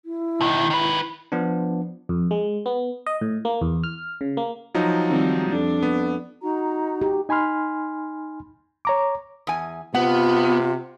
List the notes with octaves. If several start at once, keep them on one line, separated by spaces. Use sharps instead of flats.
E4
B2 D#3
D#3 B4
F3 B3 D4
F2
G#3
B3
D#5
A2
A#3
E2
F6
C#3
A#3
F3 F#3 D#4
D#3 G3 C4
F2 D4
B3
D#4 F#4 A#5
G4
D#4 G#5 B5 C6 F6
C#5 A#5 D6
E2 G#5
C3 B3 F4 F#5